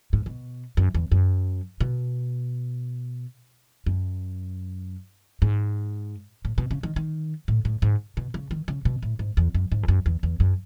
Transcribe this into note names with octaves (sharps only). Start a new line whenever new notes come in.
G#2
B2
F#2
E2
F#2
B2
F#2
G#2
A2
B2
C#3
D#3
D#3
A2
A2
G#2
B2
C#3
D#3
C#3
B2
A2
G#2
E2
F#2
G#2
E2
F#2
E2
E2
F#2